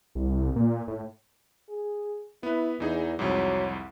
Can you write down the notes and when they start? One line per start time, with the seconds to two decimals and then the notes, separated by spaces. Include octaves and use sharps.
0.15 C2
0.56 A#2
0.88 A2
1.69 G#4
2.43 B3 E4 B4
2.80 E2 E3 D#4 G#4
3.19 C2 F2 G#2 F#3